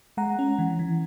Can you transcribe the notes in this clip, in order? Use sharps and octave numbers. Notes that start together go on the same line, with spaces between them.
G#3 F#5 A#5
C#4
E3
E3